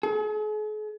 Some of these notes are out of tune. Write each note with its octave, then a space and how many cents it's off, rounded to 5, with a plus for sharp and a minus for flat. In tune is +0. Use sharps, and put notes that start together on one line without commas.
G#4 +45